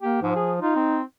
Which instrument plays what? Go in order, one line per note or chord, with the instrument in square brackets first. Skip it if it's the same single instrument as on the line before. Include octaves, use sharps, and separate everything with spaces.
[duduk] A#3 [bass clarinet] G4
[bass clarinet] G#2 [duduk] F3
[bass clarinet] G#4
[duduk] D#4 [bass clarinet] F4
[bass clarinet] C4